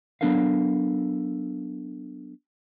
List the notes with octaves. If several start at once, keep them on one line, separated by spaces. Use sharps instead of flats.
F#3 B3 D4 A4 A#4 F5